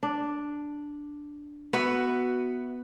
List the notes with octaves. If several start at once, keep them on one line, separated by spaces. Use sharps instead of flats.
D4
B3 F#4 B4 E5